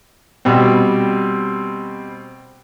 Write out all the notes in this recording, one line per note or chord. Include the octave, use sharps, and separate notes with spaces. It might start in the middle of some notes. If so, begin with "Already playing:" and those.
B2 G3 C4